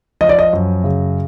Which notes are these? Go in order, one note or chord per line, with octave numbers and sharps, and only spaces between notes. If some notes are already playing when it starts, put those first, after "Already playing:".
F3 D#5
D5
D#5
F#2
C#3